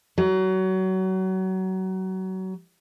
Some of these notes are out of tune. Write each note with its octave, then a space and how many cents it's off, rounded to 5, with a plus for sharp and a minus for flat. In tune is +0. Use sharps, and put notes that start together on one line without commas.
F#3 +25